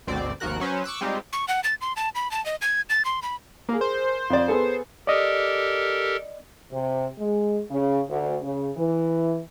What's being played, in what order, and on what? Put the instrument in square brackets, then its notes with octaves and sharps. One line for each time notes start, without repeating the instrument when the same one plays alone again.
[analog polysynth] G#1 D2 B2 C4 D5
G#1 D#2 F3 F#4 A#4 F#6
F#3 C#4 B4 C5
C#6 D6 E6 F#6
G3 G#3 C4 D#4 F4 G4
[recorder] C#6
F#5
A6
C6
A5
B5
A5
D#5
G#6
A6
C6
B5
[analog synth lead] A#3 [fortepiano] G#4 A#4
[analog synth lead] C5
[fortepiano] F2 D5
B3 G#4 A4
[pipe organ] G4 A4 A#4 [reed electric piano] D5 D#5
[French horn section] C3
G#3
C#3
D2
C#3
E3